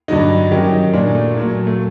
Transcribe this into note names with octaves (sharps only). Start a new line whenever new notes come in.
G2 D3 F#3 D#4
F#2 D#3 F#3 G4
D#4
A#2 F#3 D4
A3
A#2 F#3
A3